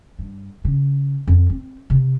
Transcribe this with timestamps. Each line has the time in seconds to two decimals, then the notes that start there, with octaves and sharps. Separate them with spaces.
0.19 G2
0.65 C#3
1.27 F2
1.49 C4
1.90 C3